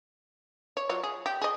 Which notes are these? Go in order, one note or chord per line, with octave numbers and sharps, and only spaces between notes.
C#5
F#3 F4 C#5
G#4
G4
G#4 D#5